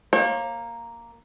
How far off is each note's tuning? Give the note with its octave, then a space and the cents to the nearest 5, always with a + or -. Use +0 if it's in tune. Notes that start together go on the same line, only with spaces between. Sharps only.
A#3 +0 C#5 -45